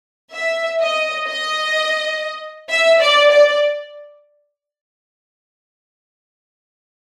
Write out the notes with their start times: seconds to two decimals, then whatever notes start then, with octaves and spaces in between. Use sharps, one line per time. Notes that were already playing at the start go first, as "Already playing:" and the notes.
0.33 E5
0.80 D#5
1.27 D#5
2.69 E5
3.00 D5
3.31 D5